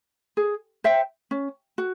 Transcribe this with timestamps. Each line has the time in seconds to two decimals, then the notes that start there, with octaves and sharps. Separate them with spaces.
0.37 G#4
0.84 C5 E5 G5
1.31 C#4
1.78 F#4